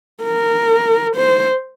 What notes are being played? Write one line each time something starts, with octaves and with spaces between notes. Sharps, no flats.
A#4
C5